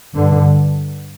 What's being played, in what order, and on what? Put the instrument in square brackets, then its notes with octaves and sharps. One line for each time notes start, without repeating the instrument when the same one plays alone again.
[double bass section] G2 D3